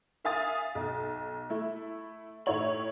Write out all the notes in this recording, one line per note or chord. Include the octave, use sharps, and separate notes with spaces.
A#4 E5 F5 G#5 D#6 A6
B1
A3 E4
A2 D#4 E4 C#5 F#7